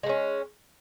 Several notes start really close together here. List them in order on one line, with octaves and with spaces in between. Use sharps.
G#3 A3 C#4